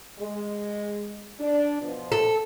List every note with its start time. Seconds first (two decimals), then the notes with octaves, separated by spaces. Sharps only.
0.19 G#3
1.39 D4
1.81 B2 F3
2.12 A4